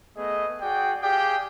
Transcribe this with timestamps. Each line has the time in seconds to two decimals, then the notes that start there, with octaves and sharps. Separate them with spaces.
0.16 A3 B3 G#4 D#5
0.62 F#4 G#4 D5 G5
1.02 G4 G#4 D5 F5 G5